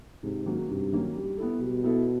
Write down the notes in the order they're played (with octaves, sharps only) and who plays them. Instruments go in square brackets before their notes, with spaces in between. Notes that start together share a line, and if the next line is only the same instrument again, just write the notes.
[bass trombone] G#2 [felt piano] C3
[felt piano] D#3 F#3 A#3 C#4
[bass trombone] G2 [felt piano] C3
[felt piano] D#3 F#3 A#3 C#4
G3
B3 E4 A4
[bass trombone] B2 [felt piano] G3
[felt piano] B3 E4 A4